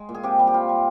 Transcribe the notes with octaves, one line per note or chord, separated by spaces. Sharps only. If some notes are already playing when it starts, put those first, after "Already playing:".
Already playing: G#3
A#2
G#4
C3 G4
G3
G4
G3 F4
G3